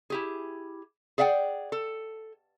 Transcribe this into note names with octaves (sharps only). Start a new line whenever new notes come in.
E4 G4 G#4
G#4 D5 E5 F#5 G5
A4